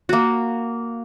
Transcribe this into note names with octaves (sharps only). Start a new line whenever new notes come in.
A#3 F#4